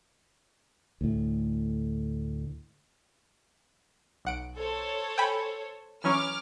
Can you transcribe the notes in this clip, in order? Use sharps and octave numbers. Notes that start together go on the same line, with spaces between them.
D2 A2
B1 F#5 D7
A4 C5 C#5
G5 G#5 B5
E3 F#3 C#4 C#5 D6 F6